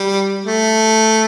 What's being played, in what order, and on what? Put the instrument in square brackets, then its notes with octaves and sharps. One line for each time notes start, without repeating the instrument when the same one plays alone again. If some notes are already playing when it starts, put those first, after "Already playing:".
Already playing: [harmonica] G3
A3